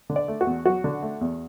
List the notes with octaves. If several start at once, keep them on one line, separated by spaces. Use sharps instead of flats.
D3
D5
A3
F#4
E2
F#3 F#4
D3
A3
E2